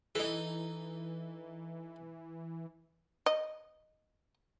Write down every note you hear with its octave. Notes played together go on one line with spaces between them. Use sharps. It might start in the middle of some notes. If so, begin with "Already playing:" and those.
E3 D#4 A4
D#5